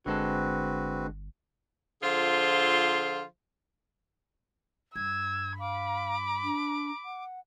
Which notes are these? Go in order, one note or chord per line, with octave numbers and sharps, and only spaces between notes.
G1 D3 G#3 C4 F#4 A4 B4
D3 F3 F4 G#4 C5
G2 E6 G#6
F5 B5 D6
D4
F#5